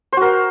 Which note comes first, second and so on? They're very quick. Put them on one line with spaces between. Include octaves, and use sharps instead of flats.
C5 F#4 A#4